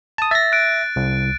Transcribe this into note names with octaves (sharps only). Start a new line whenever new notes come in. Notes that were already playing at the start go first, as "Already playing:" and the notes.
A5 D#6
E5 A6 A#6
F#6 D7
C2